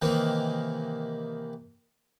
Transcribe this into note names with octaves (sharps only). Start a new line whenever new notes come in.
C3 D#3 E3 A#3